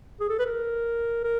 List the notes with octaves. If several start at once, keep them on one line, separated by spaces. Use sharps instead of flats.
G#4
A4
B4
A#4
A#4